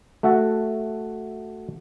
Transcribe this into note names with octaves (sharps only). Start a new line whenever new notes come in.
A3 F#4 E5 F#5 A5